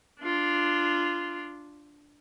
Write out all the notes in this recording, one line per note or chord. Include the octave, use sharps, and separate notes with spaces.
D4 F4